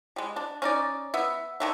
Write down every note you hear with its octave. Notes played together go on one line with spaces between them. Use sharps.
G3 G#3
D4
C#4 D#4 D5
B3 E5
D3 D#3 E5